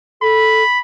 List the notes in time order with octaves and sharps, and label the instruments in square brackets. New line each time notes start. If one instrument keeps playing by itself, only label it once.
[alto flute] A4 [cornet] B5